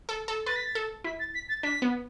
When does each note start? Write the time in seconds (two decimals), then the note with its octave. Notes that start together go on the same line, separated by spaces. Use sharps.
0.09 A4
0.28 A4
0.46 B4 A6
0.56 B6
0.66 A6
0.75 A4
1.04 E4 B6
1.19 A6
1.34 B6
1.49 A6
1.63 D4 B6
1.82 B3